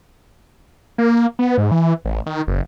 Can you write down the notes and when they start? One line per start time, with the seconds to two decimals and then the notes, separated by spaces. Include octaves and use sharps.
0.98 A#3
1.39 B3
1.58 G#2
1.71 E3
2.05 A1
2.26 D#3
2.47 F#1